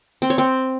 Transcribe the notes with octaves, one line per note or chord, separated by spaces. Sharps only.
C4
C#5
C4